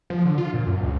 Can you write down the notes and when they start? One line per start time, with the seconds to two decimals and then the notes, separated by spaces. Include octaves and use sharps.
0.10 F3
0.25 D3
0.38 F4
0.54 A#2
0.66 F#2
0.82 C#2